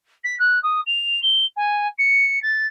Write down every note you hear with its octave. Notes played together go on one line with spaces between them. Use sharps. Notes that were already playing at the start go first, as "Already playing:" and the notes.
B6
F#6
D#6
F7
G7
G#5
C#7
A6